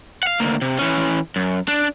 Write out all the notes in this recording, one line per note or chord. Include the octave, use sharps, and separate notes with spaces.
F5 F#5
D2 A#3
C3
E3 C#4
F#2
D4